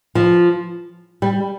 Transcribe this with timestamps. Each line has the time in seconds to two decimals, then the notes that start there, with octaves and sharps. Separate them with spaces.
0.15 F3
1.22 G3